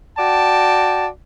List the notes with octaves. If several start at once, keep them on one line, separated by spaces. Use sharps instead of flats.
F#4 D5 G5 A5